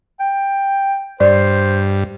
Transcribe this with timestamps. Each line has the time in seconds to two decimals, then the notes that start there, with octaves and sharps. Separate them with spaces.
0.20 G5
1.20 G2 C5 D5